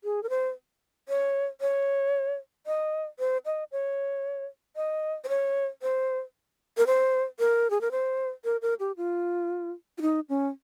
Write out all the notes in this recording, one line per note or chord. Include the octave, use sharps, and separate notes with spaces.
G#4
A#4
C5
C#5
C#5
D#5
C5
D#5
C#5
D#5
C5
C#5
C5
A#4
C5
A#4
G#4
A#4
C5
A#4
A#4
G4
F4
F4
D#4
C#4